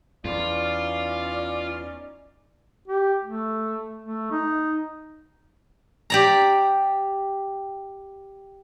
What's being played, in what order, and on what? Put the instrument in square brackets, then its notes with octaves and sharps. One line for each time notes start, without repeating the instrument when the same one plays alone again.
[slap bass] E2 [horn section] C#4 D#4 D5 [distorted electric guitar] F4
[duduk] G4
A3
A3
D#4
[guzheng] G4 D5 A#5